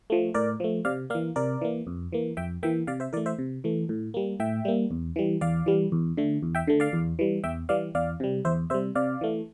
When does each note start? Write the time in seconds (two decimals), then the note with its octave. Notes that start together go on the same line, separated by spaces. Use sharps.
0.10 F3 A3
0.34 A2 A#4 D5
0.60 F3 A3
0.85 C3 D5 F5
1.10 A#3 D5 F5
1.15 E3
1.36 C3 A#4 D5
1.61 E3 A#3
1.87 F2
2.12 E3 A#3
2.37 F2 E5 G5
2.63 E3 A#3 E5 G5
2.87 C3 D5 F5
3.00 C5 E5
3.13 E3 A#4 D5
3.17 A3
3.26 C5 E5
3.39 C3
3.64 E3 A3
3.89 A2
4.14 G3 A#3
4.40 A2 E5 G5
4.65 G3 A#3
4.91 E2
5.16 E3 G3
5.41 E2 D5 F5
5.66 E3 G3
5.92 E2
6.17 D3 A3
6.43 E2
6.55 E5 G5
6.67 D3 A3
6.80 D5 F5
6.93 E2
7.19 E3 G3
7.44 E2 E5 G5
7.69 E3 G3 D5 F5
7.95 E2 D5 F5
8.20 C3 G3
8.45 E2 C5 E5
8.70 C3 C5 E5
8.74 G3
8.95 C3 D5 F5
9.21 E3 A3